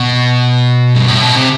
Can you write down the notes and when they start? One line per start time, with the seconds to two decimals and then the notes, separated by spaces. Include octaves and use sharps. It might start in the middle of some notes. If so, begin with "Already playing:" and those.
Already playing: B2
0.94 G2
1.08 A2
1.21 B2
1.35 C3